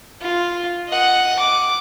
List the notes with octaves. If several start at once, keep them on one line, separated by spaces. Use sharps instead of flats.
F4
D#5 F#5
D6